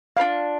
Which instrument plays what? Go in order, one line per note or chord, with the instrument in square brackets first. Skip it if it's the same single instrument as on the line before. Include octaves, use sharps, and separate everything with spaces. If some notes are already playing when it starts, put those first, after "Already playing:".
[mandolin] D4 F4 B4 D5 [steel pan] F5